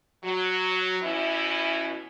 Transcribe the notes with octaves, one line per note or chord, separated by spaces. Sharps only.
F#3
B2 E3 C#4 E4